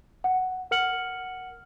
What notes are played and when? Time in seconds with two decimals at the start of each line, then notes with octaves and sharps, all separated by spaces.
0.24 F#5
0.71 A#4 F#5 F6 C#7 F#7